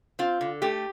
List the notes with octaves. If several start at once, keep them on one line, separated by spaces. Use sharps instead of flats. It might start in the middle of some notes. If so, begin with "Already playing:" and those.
C4 F4
D3
A3 G4